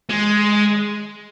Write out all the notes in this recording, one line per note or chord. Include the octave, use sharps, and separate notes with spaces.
G#3